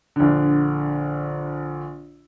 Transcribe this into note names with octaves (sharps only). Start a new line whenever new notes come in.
A#1 D3